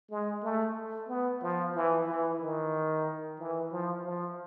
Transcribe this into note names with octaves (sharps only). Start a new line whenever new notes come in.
G#3
A3
B3
F3
E3
E3
D#3
E3
F3
F3